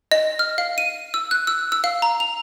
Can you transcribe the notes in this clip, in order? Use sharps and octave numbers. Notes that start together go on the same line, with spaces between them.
D#5
F6
F5
D#7
E6
F#6
E6
E6
F5
A#5
F7